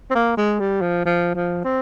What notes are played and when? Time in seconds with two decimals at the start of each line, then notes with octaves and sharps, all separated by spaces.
0.10 C4
0.15 A#3
0.37 G#3
0.60 G3
0.81 F3
1.05 F3
1.35 F3
1.64 C4